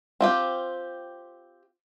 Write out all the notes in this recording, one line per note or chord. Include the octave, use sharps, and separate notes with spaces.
C4 F4 G4